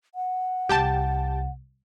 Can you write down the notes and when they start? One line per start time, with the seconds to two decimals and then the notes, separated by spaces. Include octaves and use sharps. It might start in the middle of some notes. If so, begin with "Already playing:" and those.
0.15 F#5
0.69 C2 G4 G5 A5